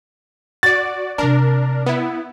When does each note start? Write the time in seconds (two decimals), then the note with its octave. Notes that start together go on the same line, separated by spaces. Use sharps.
0.63 F#4 D5 A6
1.18 C3 C4 D4 A#4
1.86 B3 E4